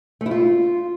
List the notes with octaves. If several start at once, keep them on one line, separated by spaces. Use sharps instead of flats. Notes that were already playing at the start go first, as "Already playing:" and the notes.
A3
E4
F4